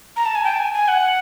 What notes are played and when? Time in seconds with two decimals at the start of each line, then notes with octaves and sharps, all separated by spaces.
0.16 A#5
0.25 A5
0.35 G#5
0.44 G5
0.54 A5
0.59 G#5
0.74 G#5
0.88 F#5